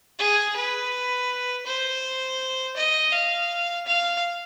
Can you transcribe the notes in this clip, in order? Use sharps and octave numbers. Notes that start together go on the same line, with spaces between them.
G#4
B4
C5
D#5
F5
F5